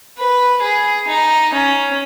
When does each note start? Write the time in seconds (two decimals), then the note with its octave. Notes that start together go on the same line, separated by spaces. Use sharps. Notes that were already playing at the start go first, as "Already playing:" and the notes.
0.19 B4
0.63 G#4
1.07 D#4
1.53 C#4